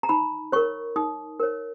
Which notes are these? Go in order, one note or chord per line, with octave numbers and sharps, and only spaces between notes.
A#5
D#4 B5
A#4 C#5 C#6
D#4 D#6
A#4 C#5